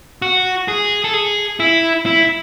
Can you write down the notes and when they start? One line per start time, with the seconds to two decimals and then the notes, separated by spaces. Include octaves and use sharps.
0.22 F#4
0.68 G#4
1.04 A4
1.14 G#4
1.60 E4
2.06 E4